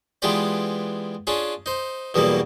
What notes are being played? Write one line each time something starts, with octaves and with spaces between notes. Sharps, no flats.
E3 G#3 B3 F4 G4 D5
C#4 D4 F4 G#4
D#4 C5
E2 B2 E3 F#3 G3 A#3